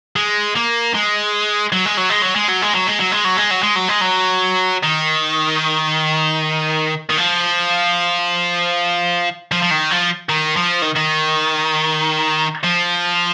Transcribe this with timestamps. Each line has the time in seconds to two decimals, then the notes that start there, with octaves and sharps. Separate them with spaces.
0.16 G#3
0.55 A#3
0.94 G#3
1.72 F#3
1.85 G#3
1.98 F#3
2.10 G#3
2.22 F#3
2.36 G#3
2.48 F#3
2.62 G#3
2.74 F#3
2.87 G#3
3.00 F#3
3.12 G#3
3.25 F#3
3.37 G#3
3.51 F#3
3.63 G#3
3.76 F#3
3.89 G#3
4.02 F#3
4.83 D#3
7.10 D#3
7.18 F3
9.52 F3
9.62 F3
9.71 D#3
9.91 F3
10.29 D#3
10.56 F3
10.82 D#3
10.96 D#3
12.63 F3